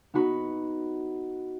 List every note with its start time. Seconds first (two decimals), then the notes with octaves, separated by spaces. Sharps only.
0.14 B3 D#4 F#4 B5